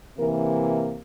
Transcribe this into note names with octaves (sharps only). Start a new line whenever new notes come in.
C3 E3 A#3 A#4